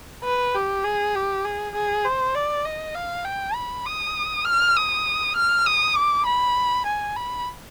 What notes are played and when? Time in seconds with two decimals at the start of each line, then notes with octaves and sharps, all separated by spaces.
0.24 B4
0.55 G4
0.84 G#4
1.15 G4
1.45 G#4
1.74 G#4
2.05 C5
2.35 D5
2.65 D#5
2.95 F5
3.25 G5
3.55 B5
3.86 D#6
4.45 F6
4.76 D#6
5.36 F6
5.66 D#6
5.95 D6
6.25 B5
6.86 G#5
7.16 B5